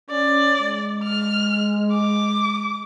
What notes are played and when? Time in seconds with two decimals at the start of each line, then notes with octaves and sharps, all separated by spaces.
0.10 C#4 D5
0.60 G#3
1.04 F6
1.92 D6